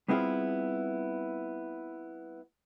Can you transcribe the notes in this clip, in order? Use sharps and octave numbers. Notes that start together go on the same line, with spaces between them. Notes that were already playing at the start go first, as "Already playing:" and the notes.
G3 B3 C4 E4 F4 G#4